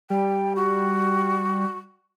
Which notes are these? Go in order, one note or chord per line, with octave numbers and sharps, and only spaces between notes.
G3 G5
F#4